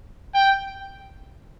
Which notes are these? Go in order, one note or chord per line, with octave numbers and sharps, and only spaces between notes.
G5